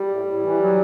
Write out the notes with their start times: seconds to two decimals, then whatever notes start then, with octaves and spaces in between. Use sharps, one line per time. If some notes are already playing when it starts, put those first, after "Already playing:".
Already playing: G3
0.08 A2
0.25 A2
0.42 E3
0.59 F#3